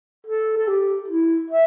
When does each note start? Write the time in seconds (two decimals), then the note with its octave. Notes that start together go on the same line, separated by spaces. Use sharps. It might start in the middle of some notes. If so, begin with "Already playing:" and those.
0.27 A4
0.57 A4
0.68 G4
1.08 E4
1.50 E5